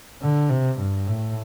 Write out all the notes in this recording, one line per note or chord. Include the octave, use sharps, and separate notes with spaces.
D3
C3
G2
A2